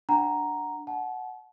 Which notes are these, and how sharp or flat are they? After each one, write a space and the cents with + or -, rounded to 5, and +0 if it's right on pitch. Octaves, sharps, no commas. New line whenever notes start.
D4 +0 F#5 +0 A#5 +0
F#5 +0 A5 -35